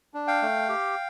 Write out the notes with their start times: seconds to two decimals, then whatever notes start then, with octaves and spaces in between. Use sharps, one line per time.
0.14 D4
0.27 F5 G5
0.42 A3
0.69 G4